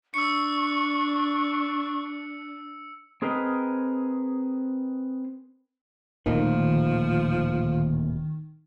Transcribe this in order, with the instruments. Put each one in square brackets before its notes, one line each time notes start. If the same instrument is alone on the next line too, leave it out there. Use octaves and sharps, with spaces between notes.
[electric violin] D4 [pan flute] C#6 [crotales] E6 C#7
[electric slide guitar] C4 G#4 A#4 B4 D#5
[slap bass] D1 A#2 A3 [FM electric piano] D#3 [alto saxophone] F3